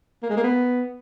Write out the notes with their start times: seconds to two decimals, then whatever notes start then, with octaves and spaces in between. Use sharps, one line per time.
0.23 A#3
0.30 G#3
0.37 A#3
0.44 B3